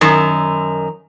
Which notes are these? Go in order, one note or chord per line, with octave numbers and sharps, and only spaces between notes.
F#2 D#3